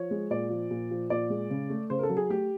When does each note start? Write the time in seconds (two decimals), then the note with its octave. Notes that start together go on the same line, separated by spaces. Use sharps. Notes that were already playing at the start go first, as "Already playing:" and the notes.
Already playing: F3 C#5
0.11 G#3
0.30 A#2 D5
0.50 F3
0.71 A#2
0.91 F3
1.10 A#2 D5
1.30 G#3
1.50 C#3
1.70 A3
1.90 C#3 C5
1.99 A#4
2.03 A4
2.10 F#3
2.17 G#4
2.29 A3 G4